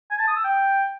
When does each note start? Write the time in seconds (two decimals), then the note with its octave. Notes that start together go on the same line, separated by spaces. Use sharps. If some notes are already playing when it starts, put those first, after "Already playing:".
0.11 G#5
0.19 A5
0.28 D#6
0.36 E6
0.44 G5